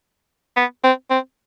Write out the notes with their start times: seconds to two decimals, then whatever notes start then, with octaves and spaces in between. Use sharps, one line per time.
0.57 B3
0.84 C4
1.11 C4